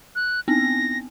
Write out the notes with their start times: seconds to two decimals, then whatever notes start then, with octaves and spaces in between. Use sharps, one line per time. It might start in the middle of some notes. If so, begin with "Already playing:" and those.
0.15 F#6
0.48 B3 C4 A#6